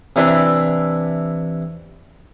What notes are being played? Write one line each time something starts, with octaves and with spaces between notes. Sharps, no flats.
C3 E3 D4 E4